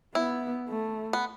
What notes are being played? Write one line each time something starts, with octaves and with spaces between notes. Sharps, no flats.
B3 E4
A3
B3